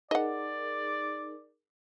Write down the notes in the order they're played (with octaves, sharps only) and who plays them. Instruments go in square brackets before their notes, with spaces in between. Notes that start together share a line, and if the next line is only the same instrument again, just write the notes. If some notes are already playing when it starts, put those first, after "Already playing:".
[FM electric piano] D#4 G#4 A#4 [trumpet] D5 [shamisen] D#5 F#5